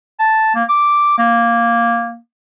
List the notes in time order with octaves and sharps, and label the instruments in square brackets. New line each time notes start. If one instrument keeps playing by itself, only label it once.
[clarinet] A5
A#3
D6
A#3